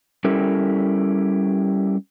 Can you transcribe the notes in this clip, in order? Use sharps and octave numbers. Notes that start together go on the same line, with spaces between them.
G3 C#4 E4 G4 A4 A#4